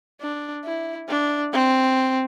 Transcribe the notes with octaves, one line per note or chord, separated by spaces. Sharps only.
D4
E4
D4
C4